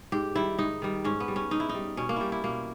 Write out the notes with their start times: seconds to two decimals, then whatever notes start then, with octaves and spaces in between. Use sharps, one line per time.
0.12 G#2 G4
0.35 D#3 G3 E4
0.59 G#2 D#4
0.82 D#3 G3
1.04 G#2 C#4
1.20 B3
1.28 G3
1.36 C#4
1.51 G#2 D#4
1.60 E4
1.69 D#4
1.74 G3
1.97 B2 C#4
2.09 A#3
2.16 G3 E4 G4
2.32 E4
2.44 B2 A#3